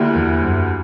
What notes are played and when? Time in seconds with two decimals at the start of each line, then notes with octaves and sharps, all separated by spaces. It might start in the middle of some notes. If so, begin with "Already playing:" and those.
Already playing: D2 D3 A#3 E4 G4
0.16 E2
0.42 F#2